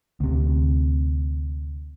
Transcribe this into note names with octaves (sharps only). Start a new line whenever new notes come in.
D2 C3